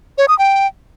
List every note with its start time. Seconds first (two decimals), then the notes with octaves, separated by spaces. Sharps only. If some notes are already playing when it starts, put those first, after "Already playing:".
0.18 C#5
0.28 D#6
0.39 G5